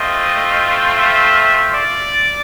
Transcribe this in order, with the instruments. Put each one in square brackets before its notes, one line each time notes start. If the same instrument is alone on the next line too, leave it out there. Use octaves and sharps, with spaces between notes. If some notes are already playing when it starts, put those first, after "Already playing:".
Already playing: [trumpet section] A3 C4 F4 D#5
E5
D5